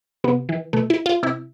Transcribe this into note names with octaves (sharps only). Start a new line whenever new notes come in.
C3 B3
E3
B2 A3
E4
F4
C3 E4